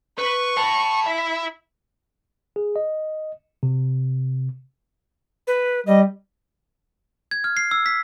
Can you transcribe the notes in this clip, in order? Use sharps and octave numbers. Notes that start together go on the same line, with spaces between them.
B4 C#6
A5 B5
E4 E5
G#4
D#5
C3
B4
G3 D#5
G#6
F6
C7
E6
B6